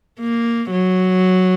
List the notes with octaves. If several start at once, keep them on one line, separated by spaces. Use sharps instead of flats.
A#3
F#3